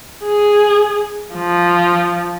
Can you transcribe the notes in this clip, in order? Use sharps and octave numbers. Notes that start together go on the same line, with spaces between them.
G#4
F3